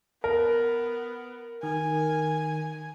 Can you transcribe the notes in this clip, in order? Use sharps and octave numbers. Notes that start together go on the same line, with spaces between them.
B3 A#4
D#3 G#5